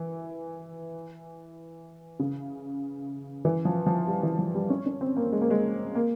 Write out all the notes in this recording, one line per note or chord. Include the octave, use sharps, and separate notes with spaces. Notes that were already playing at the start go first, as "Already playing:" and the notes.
Already playing: E3
C#3
E3
F3
F3
G3
E3
F3
G3
C#4
C#4
C4
A#3
G#3
A#3
G#3
A#3